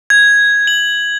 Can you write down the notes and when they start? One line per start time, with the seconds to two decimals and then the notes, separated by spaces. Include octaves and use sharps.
0.10 G#6
0.67 F#7